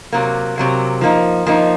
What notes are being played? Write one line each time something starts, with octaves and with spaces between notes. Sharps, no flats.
C3 F#3 A#3
C3 F#3 A#3
F3 A#3 D#4
F3 A#3 D#4